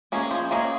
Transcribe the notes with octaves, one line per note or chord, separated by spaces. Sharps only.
A#3 C#4 G#4 D#5
F3
A#3 C#4 G#4 D#5